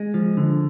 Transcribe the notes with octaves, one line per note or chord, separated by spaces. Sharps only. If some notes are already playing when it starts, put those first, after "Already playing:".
Already playing: G#3
F3
D3